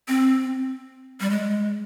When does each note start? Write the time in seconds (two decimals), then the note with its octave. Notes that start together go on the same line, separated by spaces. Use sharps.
0.08 C4
1.20 G3
1.30 G#3